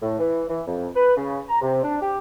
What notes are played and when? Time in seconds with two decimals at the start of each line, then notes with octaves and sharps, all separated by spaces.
0.02 A2
0.19 E3
0.50 E3
0.67 F2
0.96 B4
1.17 C#3
1.49 A#5
1.61 C3
1.83 D4
2.01 G4